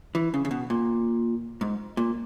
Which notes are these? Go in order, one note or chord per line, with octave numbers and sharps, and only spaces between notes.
E3
C#3
C#3
B2
A#2
G#2
A#2